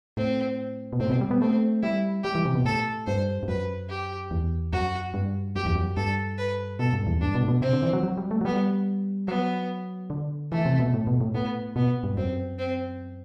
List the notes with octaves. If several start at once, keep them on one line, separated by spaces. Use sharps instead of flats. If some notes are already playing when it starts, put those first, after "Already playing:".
A2 C4
B2
A2 C4
C3
B2
G3
B3
A3 C4
G3 E4
G3 G4
E3
C3
B2
A2 A4
G2 C5
G2
F#2 B4
G4
E2
F#2 F#4
G2
F#2 G4
E2
F#2
G2 A4
B4
B2 A4
G2
E2
G2 D4
B2
A2
B2
C3 C4
D3
E3
F#3
F#3
G3
A3
F#3
G3 B3
F#3 B3
D3
E3 A3
C3
B2
A2
B2
A2
A2 B3
B2 B3
G2
F#2 C4
C4